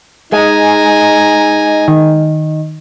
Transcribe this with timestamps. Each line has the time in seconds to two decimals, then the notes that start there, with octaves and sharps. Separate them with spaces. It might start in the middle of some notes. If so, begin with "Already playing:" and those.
0.32 G#3 D#4 G#5 A#5
1.88 D#3